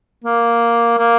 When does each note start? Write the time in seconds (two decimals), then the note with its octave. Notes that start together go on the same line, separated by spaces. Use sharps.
0.24 A#3
0.98 A#3